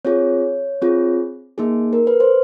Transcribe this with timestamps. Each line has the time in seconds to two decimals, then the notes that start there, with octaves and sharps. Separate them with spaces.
0.05 C4 F4 G#4 C#5
0.82 C4 F4 G#4
1.58 A#3 D#4 G#4
1.93 A#4
2.07 B4
2.20 C5